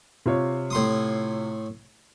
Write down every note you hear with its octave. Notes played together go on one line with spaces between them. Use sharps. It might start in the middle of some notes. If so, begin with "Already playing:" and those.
C3 F4 C#5
A2 C6 D#6